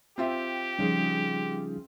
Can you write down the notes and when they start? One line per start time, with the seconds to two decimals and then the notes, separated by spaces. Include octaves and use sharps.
0.18 C4 F4 G4 E5
0.79 C#3 F3 G3 C#4 D#4 G#4